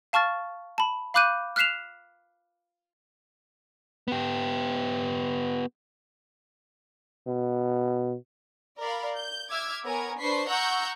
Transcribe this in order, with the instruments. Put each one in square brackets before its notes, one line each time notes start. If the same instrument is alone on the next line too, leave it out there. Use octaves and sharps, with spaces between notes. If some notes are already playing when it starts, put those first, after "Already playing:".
[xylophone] F5 A5 C#6 F6 A6
A5 B5
F5 B5 D6 F#6 G6 D#7
F6 F#6 B6 C7 E7 F7
[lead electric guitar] B3 G4
[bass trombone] B2
[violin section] A#4 D5 F5 B5
G6
E5 D6 E6 F6 G#6
B3 A#4 C#5 G#5 A#5 G#6
D4 B4 C5 C#6 B6 C7
F#5 A#5 C#6 E6 F#6 G6